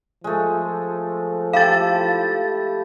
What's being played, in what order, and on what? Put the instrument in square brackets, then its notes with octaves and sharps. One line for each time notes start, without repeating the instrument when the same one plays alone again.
[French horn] F3 [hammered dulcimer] G#3 A3
[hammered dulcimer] E4 G4 A4 [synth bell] F5 A6